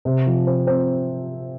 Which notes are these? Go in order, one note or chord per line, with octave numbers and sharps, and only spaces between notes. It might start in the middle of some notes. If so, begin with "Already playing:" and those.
C3
F3
C4
C4